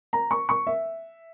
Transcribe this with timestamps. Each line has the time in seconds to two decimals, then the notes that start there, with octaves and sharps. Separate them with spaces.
0.13 A#5
0.31 C#6
0.49 C#6
0.67 E5